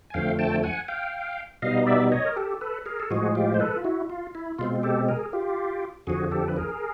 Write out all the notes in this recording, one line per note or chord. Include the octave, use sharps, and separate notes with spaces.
G#5
F2 D3 F3 A3 F5 G5
G5 A5
F#5 G#5
F5 G5
B2 G3 B3 D#4 D#5 F5
D5 E5
C#5 D#5
A#4
G4 A4
A4 B4
G#4 A#4
A4
A2 F3 G#3 F#4 G#4
F4 G4
C5
A4 B4
F4
E4 F#4
F4
E4
B2 G#3 C4 F4
G4 A4
G#4 A#4
F4 G4
F2 D3 F3 F#4 G#4
G4 A4
B4
G#4 A#4